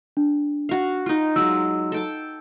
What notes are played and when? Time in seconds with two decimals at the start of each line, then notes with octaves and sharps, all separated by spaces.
0.17 D4
0.69 F#4 F5
1.06 D#4 F4
1.36 F#3 G#3 F4 E6
1.92 A4 G5 A5